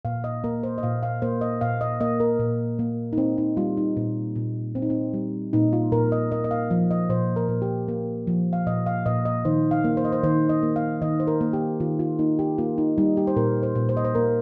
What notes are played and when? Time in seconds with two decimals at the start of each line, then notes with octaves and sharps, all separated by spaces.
0.05 A#2 F5
0.24 D#5
0.44 A#3 A#4
0.63 C5
0.78 D#5
0.83 A#2 F5
1.03 F5
1.22 A#3 C5
1.41 D#5
1.61 A#2 F5
1.81 D#5
2.00 A#3 D#5
2.20 A#4
2.40 A#2
2.79 A#3
3.13 D#4
3.18 C4
3.38 D#4
3.57 G3 F4
3.77 D#4
3.97 A#2
4.36 A#2
4.75 C4
4.82 D#4
4.90 C4
5.14 G3
5.53 A#2 D#4
5.73 F4
5.92 A#2 A#4
6.12 D#5
6.31 A#3 D#5
6.44 D#5
6.51 F5
6.71 F3
6.91 D#5
7.10 A#2 C5
7.36 A#4
7.48 A#2
7.62 G4
7.88 A#3
8.27 F3
8.53 F5
8.67 A#2 D#5
8.86 F5
9.06 A#2 D#5
9.25 D#5
9.45 D#3 C5
9.71 F5
9.84 A#3
9.97 C5
10.05 D#5
10.12 C5
10.23 D#3 C5
10.49 D#5
10.63 A#3
10.76 F5
11.02 D#3 D#5
11.20 C5
11.27 A#4
11.41 A#3
11.53 G4
11.80 D#3 F4
11.99 F4
12.19 A#3 D#4
12.39 G4
12.58 A#3 F4
12.78 D#4
12.98 G3 D#4
13.17 G4
13.27 C5
13.36 A#2 A#4
13.63 C5
13.75 A#2
13.89 C5
13.97 D#5
14.05 C5
14.15 A#3 A#4